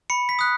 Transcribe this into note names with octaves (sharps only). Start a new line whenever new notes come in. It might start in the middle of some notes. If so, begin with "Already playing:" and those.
B5 C#7
B6
D#6 F#6